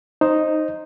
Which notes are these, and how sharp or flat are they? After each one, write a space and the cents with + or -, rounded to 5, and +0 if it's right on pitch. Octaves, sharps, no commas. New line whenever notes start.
D#4 +0 C5 +15